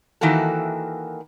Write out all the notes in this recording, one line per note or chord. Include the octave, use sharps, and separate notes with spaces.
D#3 E3 A#3 F#4 A4